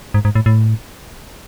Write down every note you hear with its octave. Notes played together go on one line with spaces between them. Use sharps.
G#2
G#2
A2
A2